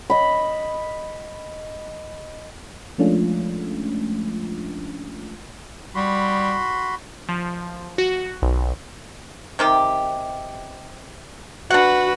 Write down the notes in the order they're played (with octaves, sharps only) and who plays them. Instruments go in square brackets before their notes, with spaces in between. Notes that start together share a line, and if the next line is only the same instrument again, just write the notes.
[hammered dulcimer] D#5 B5
[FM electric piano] F3 G#3 A3 C#4 D4 F4
[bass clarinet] G3 [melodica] F#4 B5 C6
[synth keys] F3
F#4
B1
[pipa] C3 D#3 G4
[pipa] D4 F#5 [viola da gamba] F#4 B4